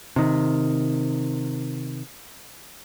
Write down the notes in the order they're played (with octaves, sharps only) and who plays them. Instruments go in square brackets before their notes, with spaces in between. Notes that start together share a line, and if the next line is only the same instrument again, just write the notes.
[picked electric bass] C3 D#3